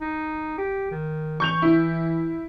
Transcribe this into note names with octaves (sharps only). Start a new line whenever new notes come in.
D#4
G4
D#3
E3 C#6 G6 F7
E4